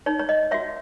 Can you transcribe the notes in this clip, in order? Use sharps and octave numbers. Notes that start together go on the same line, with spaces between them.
D#4 C#5
C#5
D#5
F#4 C#5 E5